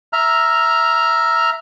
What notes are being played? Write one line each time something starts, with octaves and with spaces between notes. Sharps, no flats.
E5 A#5 F6